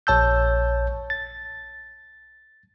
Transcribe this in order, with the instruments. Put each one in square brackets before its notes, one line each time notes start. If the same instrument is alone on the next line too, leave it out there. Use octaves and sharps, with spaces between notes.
[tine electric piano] A#1 C#5 A5 E6 G6
A6